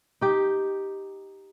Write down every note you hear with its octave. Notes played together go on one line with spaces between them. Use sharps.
D#4 G4